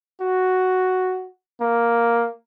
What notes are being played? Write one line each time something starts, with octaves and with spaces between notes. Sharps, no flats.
F#4
A#3